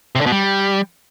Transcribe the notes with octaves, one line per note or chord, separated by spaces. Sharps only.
C3
D3
B2
G3